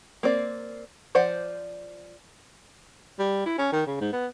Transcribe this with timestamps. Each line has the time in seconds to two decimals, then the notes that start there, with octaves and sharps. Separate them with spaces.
0.23 A#3 C4 D5
1.15 F3 C5 D5 F#5
3.19 G3
3.46 E4
3.58 C#4
3.72 D#3
3.87 C#3
4.01 G#2
4.13 B3